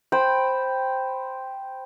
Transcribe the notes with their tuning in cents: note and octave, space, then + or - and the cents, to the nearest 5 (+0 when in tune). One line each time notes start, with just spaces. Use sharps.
C5 +0 G5 +0 B5 +0